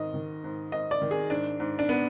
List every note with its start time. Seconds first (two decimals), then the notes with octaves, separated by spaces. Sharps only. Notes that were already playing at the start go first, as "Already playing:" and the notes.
Already playing: G#2 D#3 D#5
0.14 D#3
0.44 G#2
0.72 G#2 D#5
0.91 D5
1.02 D#3
1.11 G#4
1.30 G#2 D4
1.60 G#2
1.79 D4
1.89 B3